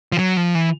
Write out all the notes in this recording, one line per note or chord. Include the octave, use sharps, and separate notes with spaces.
F3
F#3
F3
E3